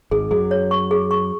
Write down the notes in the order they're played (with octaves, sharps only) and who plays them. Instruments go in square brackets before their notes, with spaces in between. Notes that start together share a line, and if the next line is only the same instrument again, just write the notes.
[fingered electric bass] G#1 G#2 [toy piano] G#4
[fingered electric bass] F#2 F#3 [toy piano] G#4
[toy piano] C#5
C#6
G#4
C#6